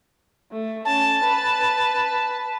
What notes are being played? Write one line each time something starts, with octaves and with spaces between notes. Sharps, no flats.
A3
C#4 A5
B4